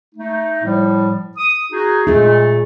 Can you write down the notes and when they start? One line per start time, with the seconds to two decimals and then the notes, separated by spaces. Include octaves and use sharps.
0.15 A3 D#4
0.63 A2 F3 G3
1.37 D#6
1.72 D#4 F#4 G#4
2.07 A#2 A3 D#4 G#4